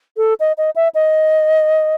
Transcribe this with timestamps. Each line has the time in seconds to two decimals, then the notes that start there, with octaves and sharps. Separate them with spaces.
0.17 A4
0.40 D#5
0.58 D#5
0.76 E5
0.95 D#5